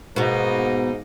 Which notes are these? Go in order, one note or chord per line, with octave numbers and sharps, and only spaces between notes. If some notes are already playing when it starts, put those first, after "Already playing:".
G#2 B2 A#3 B3 D#4